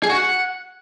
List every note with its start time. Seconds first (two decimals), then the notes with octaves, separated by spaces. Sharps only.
0.03 G#4
0.10 F#4
0.16 F#5